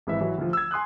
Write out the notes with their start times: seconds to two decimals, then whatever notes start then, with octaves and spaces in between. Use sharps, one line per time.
0.07 G#1 E3 E5
0.21 E3 F#3
0.38 D2 F3
0.53 E6 G#6
0.71 G#5 C6 D#6 F#6